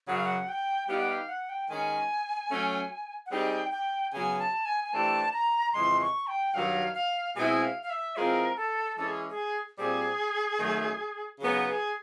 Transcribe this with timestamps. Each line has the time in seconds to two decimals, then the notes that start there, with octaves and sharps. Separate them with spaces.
0.07 F#2 C#3 F#3 F#5
0.15 F5
0.24 F#5
0.48 G5
0.88 G3 B3 D#4 G4 F5
0.99 F#5
1.08 F5
1.29 F#5
1.49 G5
1.69 D#3 G#3 C#4 G#5
2.50 F#3 A3 C#4
3.26 F#5
3.31 G3 C4 D#4 G#4 G5
3.71 G5
4.12 C#3 F#3 B3 G#5
4.39 A5
4.65 G#5
4.84 G#5
4.93 E3 A3 D4 G4 C5 A5
5.33 A#5
5.73 F2 C#3 E3 G#3 C6
6.01 C#6
6.27 G5
6.54 G2 D#3 F#3 F5
6.94 F5
7.35 B2 G#3 C4 E4 G#4 G#5
7.62 F5
7.83 F5
7.90 E5
8.16 E3 G#3 C4 F4 G#4 A#4
8.57 A4
8.97 E3 G#3 C#4 A4
9.08 G#4
9.30 G#4
9.78 A#2 G3 C4 G#4
10.58 F#2 D#3 F#3 A3
11.39 C#3 F#3 B3 D#4 G#4
11.67 G#4